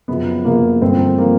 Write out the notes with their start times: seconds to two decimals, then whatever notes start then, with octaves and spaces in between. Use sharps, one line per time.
0.08 F#2 C#3 F3 B3
0.44 F#2 C#3 F3 A#3
0.82 G2 D3 F3 C4
1.18 D3 F3 A#3